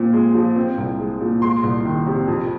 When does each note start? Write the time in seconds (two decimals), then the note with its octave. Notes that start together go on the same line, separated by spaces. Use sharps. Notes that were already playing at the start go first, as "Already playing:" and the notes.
Already playing: A#2 C4
0.13 G#3
0.35 F3
0.56 C4
0.78 C2
0.98 G#3
1.21 A#2
1.42 G#3 C6
1.63 C2
1.85 D#3
2.07 C3
2.28 F2